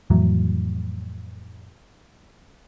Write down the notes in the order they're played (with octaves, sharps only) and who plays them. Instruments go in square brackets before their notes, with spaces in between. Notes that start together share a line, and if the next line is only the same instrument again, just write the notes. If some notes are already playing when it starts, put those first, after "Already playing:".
[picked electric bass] F2 A2 E3 F#3